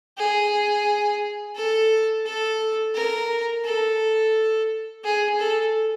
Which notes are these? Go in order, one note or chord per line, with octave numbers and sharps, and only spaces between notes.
G#4
A4
A4
A#4
A4
G#4
A4